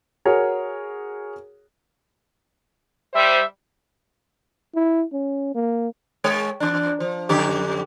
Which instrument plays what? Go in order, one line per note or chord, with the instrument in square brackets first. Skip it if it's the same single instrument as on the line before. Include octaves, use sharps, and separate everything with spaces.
[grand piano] F#4 G#4 A#4 C#5
[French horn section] G3 C5 [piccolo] E5
[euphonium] E4
C#4
A#3
[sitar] G#3 C#5
E2 D4
F3
F2 D3 G4